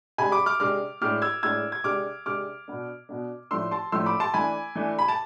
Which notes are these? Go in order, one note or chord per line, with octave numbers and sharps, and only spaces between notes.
C3 G#3 D4 G#5 B5
B5 D6
D6 F6
C3 G#3 D4 D6 F6
A2 G#3 D4 D6 F6
E6 G#6
A2 G#3 D4 E6 G#6
G#6
C3 G#3 D4 D6 F6
C3 G#3 D4 D6 F6
B2 B3 D4
B2 B3 D4
A2 F3 A3 D4 C6 E6
A5 C6
A2 F3 A3 D4 C6 E6
B5 D6
A5 C6
E3 A3 D4 G#5 B5
E3 A3 D4
B5
A5